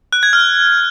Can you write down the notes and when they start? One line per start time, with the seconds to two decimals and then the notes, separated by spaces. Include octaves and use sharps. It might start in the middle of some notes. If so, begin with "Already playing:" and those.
0.13 F#6
0.23 G#6
0.33 F6